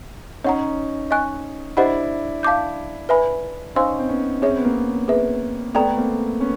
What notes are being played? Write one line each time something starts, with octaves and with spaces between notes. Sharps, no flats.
C#4 D#4 C#5 F#5 A#5
D#5 G#5 C#6 F#6
D4 E4 G4 C5 D#5 F#5 B5
F5 A5 D6 G6
B4 E5 G#5 B5
C#4 D#4 C5 F5 G#5 C6 E6
C4
B3 C#4
C#4 G#4 C#5 E5
C4
B3
A#3 C4
G#4 B4 E5
A3 B3 A4 D5 G5 A#5
A#3 C4
B3 C#4